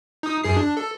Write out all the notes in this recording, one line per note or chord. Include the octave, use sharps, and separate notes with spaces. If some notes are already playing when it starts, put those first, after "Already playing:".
D#4 D#6
F#2 G#4 C7
D4
A4